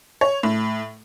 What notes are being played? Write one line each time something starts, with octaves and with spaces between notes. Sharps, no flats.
C#5
A2